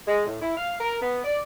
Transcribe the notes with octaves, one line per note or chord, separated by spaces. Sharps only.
G#3
A2
E4
F5
A#4
B3
D5